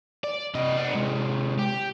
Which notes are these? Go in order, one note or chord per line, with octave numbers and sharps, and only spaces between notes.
D5
C3 D#5
B3 D4
C3 G#3
G4